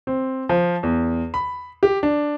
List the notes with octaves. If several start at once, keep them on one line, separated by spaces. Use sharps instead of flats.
C4
F3
E2
B5
G4
D4